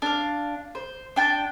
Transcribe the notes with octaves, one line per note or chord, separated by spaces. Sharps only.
D4 F5
C5
D4 G5 A5